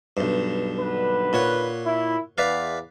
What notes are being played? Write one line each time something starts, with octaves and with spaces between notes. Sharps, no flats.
B1 G2
D#2 D3 B4
A#2 C#5 F#5
E4
E2 B4 D5 F5